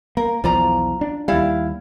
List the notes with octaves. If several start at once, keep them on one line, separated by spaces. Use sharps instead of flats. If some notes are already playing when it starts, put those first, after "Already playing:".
A#3 A#4
B1 E2 F3 F4 D5 A#5
D4
D#2 G3 E4 F5